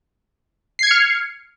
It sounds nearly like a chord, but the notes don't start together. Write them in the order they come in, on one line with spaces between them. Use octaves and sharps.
C7 G#6 C#7 F6